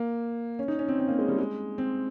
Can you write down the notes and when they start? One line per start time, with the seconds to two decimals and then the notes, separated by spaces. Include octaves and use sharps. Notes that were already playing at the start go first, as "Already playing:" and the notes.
Already playing: A#3
0.59 C#4
0.68 D#4
0.79 C#4
0.88 C4
0.99 C4
1.08 A#3
1.19 G#3
1.28 G3
1.38 G#3
1.78 C4